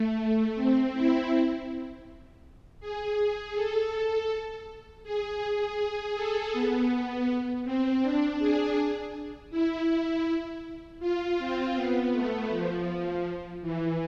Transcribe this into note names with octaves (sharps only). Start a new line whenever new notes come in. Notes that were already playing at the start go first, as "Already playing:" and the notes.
Already playing: A3
C4
E4
G#4
G#4
A4
G#4
G#4
A4
B3
C4
D4
G#4
E4
F4
C4
B3
A3
F3
E3